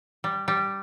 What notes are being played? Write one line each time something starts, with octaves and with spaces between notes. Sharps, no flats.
G3
G3